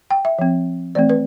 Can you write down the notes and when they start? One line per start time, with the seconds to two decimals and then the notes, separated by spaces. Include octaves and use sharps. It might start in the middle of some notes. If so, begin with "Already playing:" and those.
0.10 G5
0.25 E5
0.39 F3 C4
0.95 E3 A3 C4 D5
1.10 B4